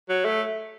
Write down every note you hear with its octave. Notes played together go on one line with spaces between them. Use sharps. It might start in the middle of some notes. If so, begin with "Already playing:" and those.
F#3
A3